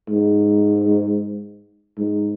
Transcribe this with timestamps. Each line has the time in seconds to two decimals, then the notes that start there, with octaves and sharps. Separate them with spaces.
0.10 G#2
1.98 G#2